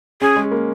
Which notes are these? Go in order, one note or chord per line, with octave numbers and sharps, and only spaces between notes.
C#4 G#4
G#3
A#3